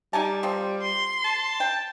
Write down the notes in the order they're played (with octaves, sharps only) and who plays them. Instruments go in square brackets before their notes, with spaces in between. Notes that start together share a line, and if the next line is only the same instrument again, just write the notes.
[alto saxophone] G3 [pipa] D#4 G#5 A5
[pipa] F3 C4
[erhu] C6
[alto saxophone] A5
[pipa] G5